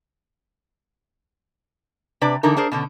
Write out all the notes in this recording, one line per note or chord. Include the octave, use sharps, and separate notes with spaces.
C3 D4 B4 D5
D3 E3 D#4 A#4
D4 G#4 A#4 C5
B2 D3 C#4